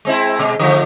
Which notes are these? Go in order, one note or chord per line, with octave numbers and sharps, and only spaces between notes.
G#3 C4 E4
B2 G#3
D3 F3 A3